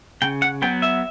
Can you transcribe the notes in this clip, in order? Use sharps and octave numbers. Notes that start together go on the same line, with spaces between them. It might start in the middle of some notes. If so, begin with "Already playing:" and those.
C#3 G5
F#5
F#3 B3 G5
E5